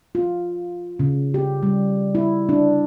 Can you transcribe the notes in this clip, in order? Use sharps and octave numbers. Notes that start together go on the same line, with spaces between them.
F4
C#3
G4
G3
E4
D4